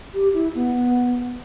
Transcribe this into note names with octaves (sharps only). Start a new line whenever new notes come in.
G4
E4
B3